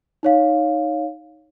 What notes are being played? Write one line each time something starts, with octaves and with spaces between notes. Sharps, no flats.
D#4 C#5 F5